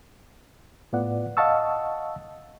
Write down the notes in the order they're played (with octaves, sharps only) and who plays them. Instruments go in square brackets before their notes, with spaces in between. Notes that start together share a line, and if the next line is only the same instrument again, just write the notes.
[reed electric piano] A2 B3 F4 D5 F#5
D#5 F5 F#5 A5 C#6 E6